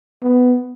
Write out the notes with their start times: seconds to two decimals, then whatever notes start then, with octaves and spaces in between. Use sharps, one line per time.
0.22 B3